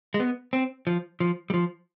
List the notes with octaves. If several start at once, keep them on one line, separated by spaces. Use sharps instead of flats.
G#3
B3
C4
F3
F3
G3
F3